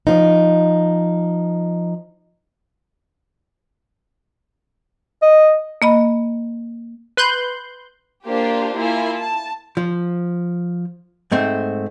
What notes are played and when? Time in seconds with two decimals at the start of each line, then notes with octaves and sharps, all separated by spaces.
0.07 F3 D#4
5.22 D#5
5.82 A#3 D#5 B5
7.17 B4 C6 F#6 G6
8.25 A#3 D4 F4 G4 C5
8.77 A#3 E4 F4 G#5
9.18 A5
9.77 F3
11.32 G#2 A3 C4